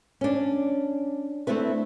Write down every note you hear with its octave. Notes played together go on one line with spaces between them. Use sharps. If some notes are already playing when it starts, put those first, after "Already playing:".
C#4 D4
A3 C4 D4 E4 B4